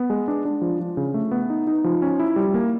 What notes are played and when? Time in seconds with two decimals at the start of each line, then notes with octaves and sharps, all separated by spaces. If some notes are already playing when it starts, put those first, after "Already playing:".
Already playing: B3
0.10 G#3
0.28 D4
0.45 D4
0.62 F3
0.80 F3
0.97 C#3
1.14 A3
1.31 B3
1.50 D#4
1.67 D#4
1.84 F3
2.02 C#4
2.19 E4
2.36 G3
2.54 A#3